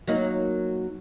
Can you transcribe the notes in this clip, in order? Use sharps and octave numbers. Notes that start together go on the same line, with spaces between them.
F#3 A#3 D#4